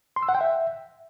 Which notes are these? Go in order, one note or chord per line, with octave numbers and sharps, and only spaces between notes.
C6
E6
F#5
G5
E5